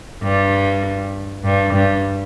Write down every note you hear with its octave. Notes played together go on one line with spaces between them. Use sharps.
G2
G2
G2